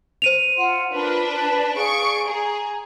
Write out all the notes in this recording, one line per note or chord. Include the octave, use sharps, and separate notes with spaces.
C5 D#7 F7
F4 F#5 C6
D4 F4 A#4 B4
A5
G#4 D5 F5 C#6 D7
G#4 A#5